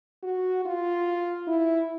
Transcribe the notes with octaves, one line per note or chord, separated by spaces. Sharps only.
F#4
F4
E4